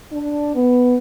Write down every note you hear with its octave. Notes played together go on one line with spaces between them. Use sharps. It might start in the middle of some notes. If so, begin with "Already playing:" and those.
D4
B3